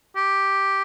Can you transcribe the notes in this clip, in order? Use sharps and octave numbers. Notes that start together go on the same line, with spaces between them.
G4